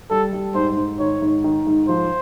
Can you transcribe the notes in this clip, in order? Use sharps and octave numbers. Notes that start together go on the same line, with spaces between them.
G3 A4
G3
G#2 C5
G#2
D#3 C#5
G#2
D#3
G#2
F3 C5